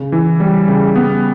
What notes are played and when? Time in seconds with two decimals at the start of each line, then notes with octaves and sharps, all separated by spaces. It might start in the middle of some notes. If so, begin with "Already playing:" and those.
Already playing: C#3
0.12 E3
0.40 G3
0.68 C#3
0.95 G3 B3